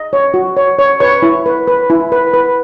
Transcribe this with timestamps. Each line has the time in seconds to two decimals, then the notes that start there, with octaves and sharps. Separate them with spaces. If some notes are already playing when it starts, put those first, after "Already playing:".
Already playing: D#5
0.13 C#5
0.34 F#4
0.57 C#5
0.79 C#5
1.00 B4 C#5 C#6
1.22 E4
1.46 B4
1.68 B4
1.90 E4
2.12 B4
2.34 B4